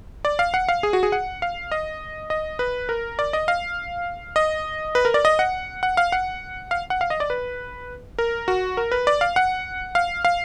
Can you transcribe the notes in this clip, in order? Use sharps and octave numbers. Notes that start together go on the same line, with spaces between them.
D5
F5
F#5
F5
G#4
F#4
G#4
F#5
F5
D#5
D#5
B4
A#4
D5
D#5
F5
D#5
B4
A#4
D5
D#5
F#5
F#5
F5
F#5
F5
F#5
F5
D#5
D5
B4
A#4
F#4
A#4
B4
D5
F5
F#5
F5
F5